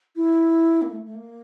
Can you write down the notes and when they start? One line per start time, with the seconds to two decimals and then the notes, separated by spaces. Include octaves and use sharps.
0.16 E4
0.82 A#3
0.89 A3
1.05 A3
1.15 A#3